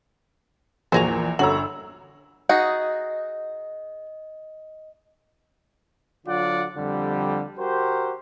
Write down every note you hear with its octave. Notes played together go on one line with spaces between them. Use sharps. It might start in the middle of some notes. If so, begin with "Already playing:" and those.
A#1 E2 A#2 F#4 G#4 C5 A#6 F7
G1 F#4 C#5 A#5 E6 F#7
D#4 F#4 G#4 D#5
D3 F#3 F4 D5 F#5
F2 D3 G3
F#4 G4 A#4 C5